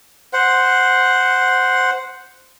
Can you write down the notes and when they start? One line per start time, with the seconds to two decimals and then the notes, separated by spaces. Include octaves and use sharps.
0.33 C5 F#5